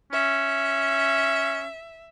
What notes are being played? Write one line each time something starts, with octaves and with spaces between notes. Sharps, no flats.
C#4 E5